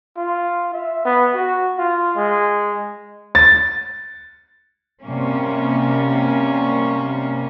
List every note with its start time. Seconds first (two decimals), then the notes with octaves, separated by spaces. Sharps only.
0.17 F4
0.73 E5
1.05 B3
1.34 F#4
1.78 F4
2.16 G#3
3.35 A6
5.02 C3 G3 A#3 C#4